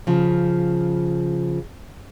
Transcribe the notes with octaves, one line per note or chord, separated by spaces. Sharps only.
C#3 F3